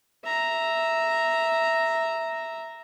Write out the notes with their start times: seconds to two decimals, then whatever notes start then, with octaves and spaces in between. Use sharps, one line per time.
0.24 E5 A#5